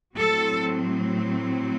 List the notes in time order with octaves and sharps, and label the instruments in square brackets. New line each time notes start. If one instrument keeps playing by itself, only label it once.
[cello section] A2 F#3 C4 A4